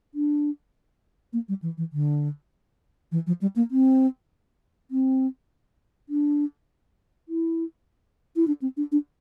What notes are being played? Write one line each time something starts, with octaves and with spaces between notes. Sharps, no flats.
D4
A#3
G3
E3
E3
D3
E3
F3
G3
A#3
C4
C4
D4
E4
E4
D4
C4
D4
D4